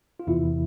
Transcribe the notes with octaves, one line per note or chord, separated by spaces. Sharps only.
F4
E2 C3 E3 E4